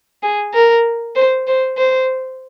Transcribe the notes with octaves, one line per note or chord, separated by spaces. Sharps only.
G#4
A#4
C5
C5
C5